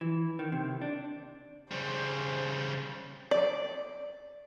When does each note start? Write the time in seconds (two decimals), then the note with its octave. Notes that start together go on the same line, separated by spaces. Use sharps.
0.01 E3
0.39 D#3
0.52 C3
0.81 D4
1.71 C#3 G3 C5
3.31 D5